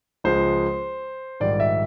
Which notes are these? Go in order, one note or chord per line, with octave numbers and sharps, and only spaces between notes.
C#2 C#3 F3 G#3 C5
A#1 G#2 D#3 G3 D5
E5